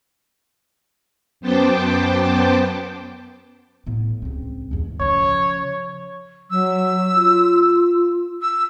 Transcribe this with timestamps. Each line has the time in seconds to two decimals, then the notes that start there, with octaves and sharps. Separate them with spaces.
1.41 F#2 B3 C5 G5 A5 D6
3.86 A2 B3
4.22 C#2 C4
4.71 E2 G#2
5.00 C#3 F3 C#5
6.51 F#3 E6
7.16 F4
8.42 E6